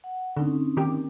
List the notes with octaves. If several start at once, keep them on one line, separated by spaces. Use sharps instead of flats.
F#5
D3 C4 C#4 D#4
D#3 G4